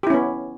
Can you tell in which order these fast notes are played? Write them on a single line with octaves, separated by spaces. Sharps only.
G4 E4 C#4 B3